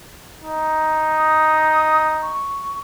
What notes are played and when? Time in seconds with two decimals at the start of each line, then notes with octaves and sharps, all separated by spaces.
0.41 D#4
1.18 D#6
2.22 C#6